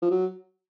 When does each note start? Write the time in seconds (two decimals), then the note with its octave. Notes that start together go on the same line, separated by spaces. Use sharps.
0.02 F3
0.11 F#3